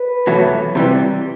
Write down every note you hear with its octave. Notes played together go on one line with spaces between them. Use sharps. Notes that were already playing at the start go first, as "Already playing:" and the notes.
Already playing: B4
E2 B2 F#3 A3
C3 E3 G3